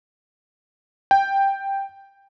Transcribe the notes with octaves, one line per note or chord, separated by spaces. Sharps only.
G5